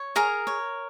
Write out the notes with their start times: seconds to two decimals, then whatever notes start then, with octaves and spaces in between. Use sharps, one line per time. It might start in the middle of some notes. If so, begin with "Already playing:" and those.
Already playing: C#5
0.16 G#4 A#4 A#5
0.47 C#5